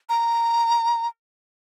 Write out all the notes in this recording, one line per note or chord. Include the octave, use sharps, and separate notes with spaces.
A#5